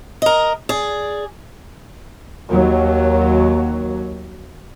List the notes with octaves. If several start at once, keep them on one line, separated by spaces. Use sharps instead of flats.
A#4 D#5
G#4 D5
D#2 F#3